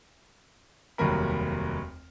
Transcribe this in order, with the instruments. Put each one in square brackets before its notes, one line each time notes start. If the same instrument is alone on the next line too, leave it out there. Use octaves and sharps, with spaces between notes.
[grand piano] F1 D#2 F#3 G3 A#4 B5